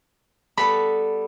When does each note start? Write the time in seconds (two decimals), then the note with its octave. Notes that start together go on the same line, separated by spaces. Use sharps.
0.57 G3 B3 A4 B5